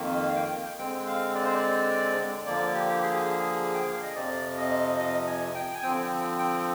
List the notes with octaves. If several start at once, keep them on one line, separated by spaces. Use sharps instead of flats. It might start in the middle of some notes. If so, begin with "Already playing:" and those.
Already playing: F2 D#3 A#3
F5
G5
D3 G#3 C4 G5
F5
D5
C5
D5
D3 F3 A#3 D5
G4
G4
G#4
G#4
G5
F5
D#5
F2 C3 F3 D5
D#5
D#5
G#5
G5
G#5
D3 F3 C4 G5
G5